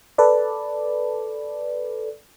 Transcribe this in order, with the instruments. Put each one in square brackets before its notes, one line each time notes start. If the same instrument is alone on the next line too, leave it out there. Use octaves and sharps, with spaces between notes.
[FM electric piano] A4 B4 D5